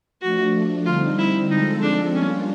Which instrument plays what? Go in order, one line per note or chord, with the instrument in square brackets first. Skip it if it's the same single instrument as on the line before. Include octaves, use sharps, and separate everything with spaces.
[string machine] F3 A3 D4 [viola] F#4
[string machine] D3 G3 C4 D#4 [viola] F4
[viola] E4
[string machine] F3 G#3 C4 F4 A4 [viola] D#4
[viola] D4
[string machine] G3 A#3 D4 F4 [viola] C#4